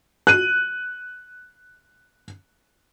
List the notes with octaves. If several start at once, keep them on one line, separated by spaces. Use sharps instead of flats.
F#6 D#7